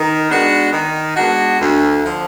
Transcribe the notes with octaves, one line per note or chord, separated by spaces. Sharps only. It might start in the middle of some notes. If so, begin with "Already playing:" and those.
Already playing: D#3
G#3 B3 D4 F#4
D#3
G#3 B3 D4 F#4
D2
D3 F3